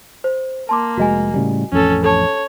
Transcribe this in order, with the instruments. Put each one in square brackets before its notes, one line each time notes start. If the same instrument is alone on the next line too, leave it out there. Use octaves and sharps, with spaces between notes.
[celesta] C5
[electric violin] A#3 [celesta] A5 C6 D6
[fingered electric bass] F1 G#3 [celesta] F#4 D#5 G#5
[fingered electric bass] A2 C#3 G3
[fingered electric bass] A1 F2 [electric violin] C#4 A4
[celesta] A4 A5 [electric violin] C#5